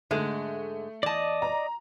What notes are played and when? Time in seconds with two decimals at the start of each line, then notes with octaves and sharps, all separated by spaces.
0.11 G#2 D3 G#3 A3
1.03 E2 D5 D#5 A5
1.42 A#5